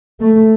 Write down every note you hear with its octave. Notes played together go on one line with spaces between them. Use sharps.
A3